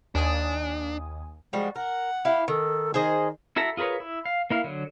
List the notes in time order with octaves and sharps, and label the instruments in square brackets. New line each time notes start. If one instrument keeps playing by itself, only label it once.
[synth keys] D#2 G#5 D#6 [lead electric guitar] D4
[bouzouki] F3 G3 F#4 [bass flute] G#3
[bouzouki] A#4 [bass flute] F#5
[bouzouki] E4 G4 F5
[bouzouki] D#3 [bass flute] A4
[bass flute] D#3 [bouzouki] G#4 C5 D#5
[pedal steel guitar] E4 F#4 A4 E5 A#5
F4 G#4 A#4 B4 C#5
E4
F5
A#3 E4 F5
D3 F#3